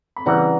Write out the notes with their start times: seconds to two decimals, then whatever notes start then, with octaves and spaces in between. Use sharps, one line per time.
0.16 B5
0.26 C#3 E3 G3 F#5 A#5